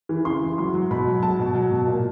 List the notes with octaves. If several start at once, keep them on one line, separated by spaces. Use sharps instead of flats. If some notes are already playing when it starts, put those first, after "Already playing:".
E3
C#3 C6
E3
F#3 C6
F#3
B2 B5
F#3
F#3 A5
B2
F#3
B2
A#2